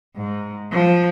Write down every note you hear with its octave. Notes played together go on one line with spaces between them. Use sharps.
G#2
F3